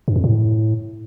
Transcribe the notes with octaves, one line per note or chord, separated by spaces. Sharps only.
G2
F2
A2